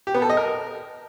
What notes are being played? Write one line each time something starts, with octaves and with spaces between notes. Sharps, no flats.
G4
B3
A4
D#5
A#4